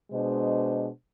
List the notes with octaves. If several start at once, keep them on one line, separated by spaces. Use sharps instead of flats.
B2 G#3 D4 C5 D#5